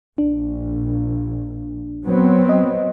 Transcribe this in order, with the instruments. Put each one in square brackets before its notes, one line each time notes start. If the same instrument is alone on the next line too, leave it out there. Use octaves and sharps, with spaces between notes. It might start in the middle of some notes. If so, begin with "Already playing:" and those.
[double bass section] A#1 [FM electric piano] D4
[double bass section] F#3 B3 C4
[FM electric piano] D#5